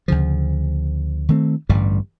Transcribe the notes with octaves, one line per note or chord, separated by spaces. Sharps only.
D2 C#3 F3
D#3 A3 C4
A1 G2 D3 G3